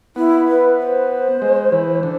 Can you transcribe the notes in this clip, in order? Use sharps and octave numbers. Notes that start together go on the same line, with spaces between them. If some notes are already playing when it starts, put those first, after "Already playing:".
B3 E4
B4
C5
G#3
E3
D3